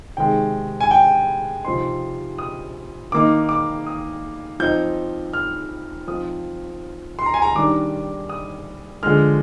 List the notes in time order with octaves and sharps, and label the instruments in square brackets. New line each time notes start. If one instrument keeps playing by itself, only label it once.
[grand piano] C3 D#3 G#3 G5
G#5
G5
C3 F3 C4 D#4 C6
D#6
D#3 A#3 D#4 D6
D6
D#6
F3 C4 D#4 G6
F6
F3 C4 D#4 D#6
C6
A#5
G#5
A#5
D#3 G3 D4 D6
D#6
D3 F3 G#3 F6